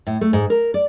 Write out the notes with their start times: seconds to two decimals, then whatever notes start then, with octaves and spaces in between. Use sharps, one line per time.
0.07 A2
0.21 A3
0.33 G#2
0.50 A#4
0.74 D5